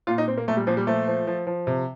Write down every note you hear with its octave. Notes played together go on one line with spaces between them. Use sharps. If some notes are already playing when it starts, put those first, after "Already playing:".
A#2 F4
D#4
A#2 C4
A#3
A#2 A3
G3
A#2 F3
G3
F3 A3
F3
F3
F3
C3